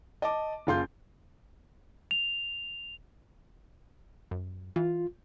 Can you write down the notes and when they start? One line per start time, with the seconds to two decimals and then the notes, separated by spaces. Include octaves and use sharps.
0.22 D#5 A5 D6
0.67 F#1 F4 C6 G6
2.11 F7
4.31 F#2
4.76 E3 F4